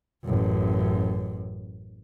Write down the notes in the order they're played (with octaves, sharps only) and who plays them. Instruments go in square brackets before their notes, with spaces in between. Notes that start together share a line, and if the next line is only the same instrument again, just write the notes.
[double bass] A1 F#2